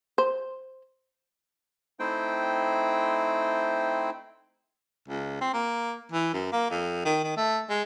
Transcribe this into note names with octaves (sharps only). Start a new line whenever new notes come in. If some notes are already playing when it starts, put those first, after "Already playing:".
C5
A3 C4 D#4 E4 C5 G5
C#2
C4
A#3
E3
F#2
A#3
F2
D#3
D#3
A3
G#3